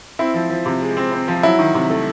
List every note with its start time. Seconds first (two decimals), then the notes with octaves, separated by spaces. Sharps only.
0.19 C4 E4
0.34 F3
0.50 F3
0.66 C3
0.81 G#3
0.97 C4
1.13 C4
1.28 F3
1.43 F#3 E4
1.59 D#3
1.74 C3
1.90 A3